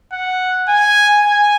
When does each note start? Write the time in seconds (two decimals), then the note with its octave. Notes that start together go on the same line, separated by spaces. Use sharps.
0.12 F#5
0.68 G#5
1.24 G#5